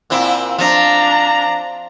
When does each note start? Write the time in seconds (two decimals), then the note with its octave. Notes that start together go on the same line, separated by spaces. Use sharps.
0.10 A#2 C4 E4
0.58 F3 D4 A#5